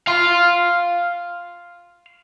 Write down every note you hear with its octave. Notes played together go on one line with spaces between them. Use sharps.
F5 C6